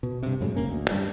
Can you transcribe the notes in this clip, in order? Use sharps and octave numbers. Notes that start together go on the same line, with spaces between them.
B2
G2 C3
F#2 A2 C#3 G#3
F1 A#3 C#4
D2
G2 G3